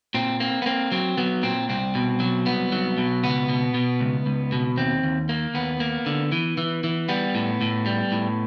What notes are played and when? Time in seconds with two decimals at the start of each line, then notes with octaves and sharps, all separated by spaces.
0.14 A#2 C4
0.40 A#3 C4
0.62 B3
0.66 A#3 C4
0.92 F#3 C4
1.17 F#3 B3
1.43 A#2 C4
1.69 C2 C4
1.95 B2
2.20 F#3
2.46 C2 B3
2.72 F#3
2.98 B2
3.23 C#2 B3
3.49 B2
3.74 B2
4.00 C#2
4.26 C#2
4.52 B2
4.77 D#2 C4
5.03 D#2
5.29 A#3
5.54 D#2 B3
5.80 A#3
6.06 D3
6.32 E3
6.58 E3
6.84 E3
7.09 G3 B3
7.35 A2
7.61 A2
7.86 G3
8.12 A2